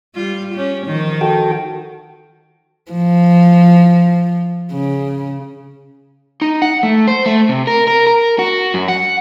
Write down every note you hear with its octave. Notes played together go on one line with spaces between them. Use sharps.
G3 F4
C#4 G4
D#3 F3
F#4 A4 G5
F3
C#3
D#4
F#5
A3
C5
A3
C3
A#4
A#4
A#4
F#4
F#2
F#5